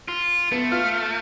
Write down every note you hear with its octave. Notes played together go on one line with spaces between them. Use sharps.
F4
A3 B3
F4 F6